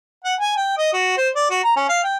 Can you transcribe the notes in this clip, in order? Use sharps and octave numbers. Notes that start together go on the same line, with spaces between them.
F#5
G#5
G5
D#5
F#4
C5
D5
F#4
A#5
C#4
F5
G5